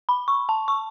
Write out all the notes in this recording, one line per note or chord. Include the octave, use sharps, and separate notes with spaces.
B5
C#6
A5
C#6